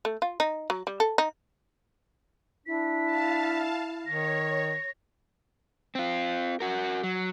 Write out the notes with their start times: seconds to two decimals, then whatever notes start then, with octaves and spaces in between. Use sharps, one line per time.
0.05 A3
0.22 F4
0.40 D#4
0.70 F#3
0.87 G3
1.00 A4
1.18 D#4
2.67 D4 E4 B6
3.05 F5 A5
4.06 D#3 C#5 A#6
5.95 C4 F4
6.60 F#4 A#4
7.03 F#3